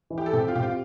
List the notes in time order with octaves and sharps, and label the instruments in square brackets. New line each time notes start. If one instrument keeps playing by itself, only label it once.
[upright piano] E3
[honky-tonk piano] G4
A4
[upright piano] C3 [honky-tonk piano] G4
[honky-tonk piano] F4
[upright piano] C3 [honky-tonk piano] G4
[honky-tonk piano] F4